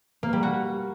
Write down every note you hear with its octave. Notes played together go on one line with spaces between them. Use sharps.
A#3
G3
F#4